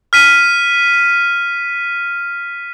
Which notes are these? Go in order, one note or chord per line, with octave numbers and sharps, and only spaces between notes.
F6 B6 D#7